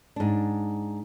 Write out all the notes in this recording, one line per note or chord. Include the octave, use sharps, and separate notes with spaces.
G#2 D4